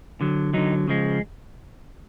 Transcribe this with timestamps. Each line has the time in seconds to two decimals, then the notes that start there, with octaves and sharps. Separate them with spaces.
0.21 D3 F#3
0.54 D3 F#3 D#4
0.88 C#3 F3 G#3